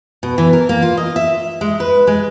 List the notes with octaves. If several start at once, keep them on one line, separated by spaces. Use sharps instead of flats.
B2
E3
A#4
A#3
F4
D#5
E5
G#3
B4
G#3